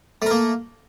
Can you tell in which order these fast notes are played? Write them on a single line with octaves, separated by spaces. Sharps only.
A3 A#4 A#3